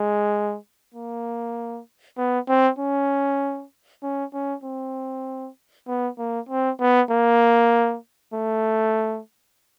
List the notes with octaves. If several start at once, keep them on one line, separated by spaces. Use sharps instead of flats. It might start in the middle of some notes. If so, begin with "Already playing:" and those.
Already playing: G#3
A#3
B3
C4
C#4
C#4
C#4
C4
B3
A#3
C4
B3
A#3
A3